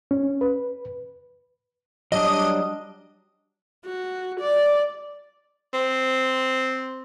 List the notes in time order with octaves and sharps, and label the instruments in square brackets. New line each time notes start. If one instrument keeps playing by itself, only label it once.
[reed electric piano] C#4
B4
[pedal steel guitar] F#3 G3 D4 [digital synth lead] D#5
[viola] F#4
D5
[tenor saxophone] C4